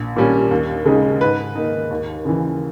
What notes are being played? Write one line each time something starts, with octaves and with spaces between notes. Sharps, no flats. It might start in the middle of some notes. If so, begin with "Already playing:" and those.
Already playing: A#1
A#2 G3 C#4
D#2
C#3 G#3 D#4
G#2 B4
D#3 A#3 D#4
D#2
C#3 E3